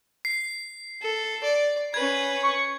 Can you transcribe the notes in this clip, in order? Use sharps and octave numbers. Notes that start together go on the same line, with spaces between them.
C7
A4
D5
C#4 B4 G#6
C#6